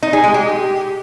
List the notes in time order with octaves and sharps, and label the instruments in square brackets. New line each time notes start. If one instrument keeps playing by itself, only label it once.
[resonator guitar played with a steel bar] D#4
G#4
G#3
G4